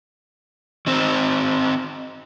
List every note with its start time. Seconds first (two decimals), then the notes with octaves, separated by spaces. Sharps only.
0.87 D#3 C4 D#4